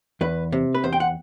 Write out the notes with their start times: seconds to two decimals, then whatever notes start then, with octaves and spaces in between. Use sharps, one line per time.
0.21 E2 B4
0.52 C3
0.75 B4
0.84 E2 C5
0.93 G5
1.00 F#5